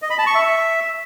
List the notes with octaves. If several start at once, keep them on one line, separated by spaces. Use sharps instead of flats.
D#5
B5
A5
C#6
E5